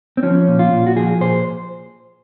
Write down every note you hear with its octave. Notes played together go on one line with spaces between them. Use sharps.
C4
F3 C#4
A#2
F4
A#2
F#4
F3 G#4
A#2 C5